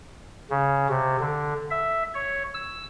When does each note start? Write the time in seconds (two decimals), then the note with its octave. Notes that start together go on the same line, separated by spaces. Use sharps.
0.51 C#3
0.89 C3
1.20 D3
1.71 E5
2.15 C#5
2.54 E6